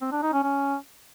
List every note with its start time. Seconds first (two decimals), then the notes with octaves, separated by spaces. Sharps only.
0.01 C4
0.12 D4
0.22 D#4
0.33 C#4
0.43 C#4